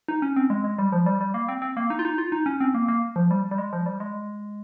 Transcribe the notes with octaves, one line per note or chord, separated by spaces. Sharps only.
D#4
C#4
C4
G#3
G#3
G3
F3
G3
G3
A#3
C4
C4
A#3
D#4
F4
D#4
F4
D#4
C#4
C4
A#3
A#3
F3
G3
G3
G#3
F3
G3
G#3